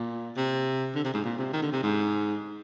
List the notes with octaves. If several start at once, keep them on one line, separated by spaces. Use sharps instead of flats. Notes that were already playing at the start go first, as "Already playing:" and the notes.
Already playing: A#2
C3
D3
C3
G#2
A#2
C3
D#3
D3
C3
G#2